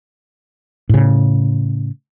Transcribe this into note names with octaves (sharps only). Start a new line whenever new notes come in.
A2 C#3